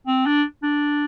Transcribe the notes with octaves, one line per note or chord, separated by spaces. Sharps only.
C4
D4
D4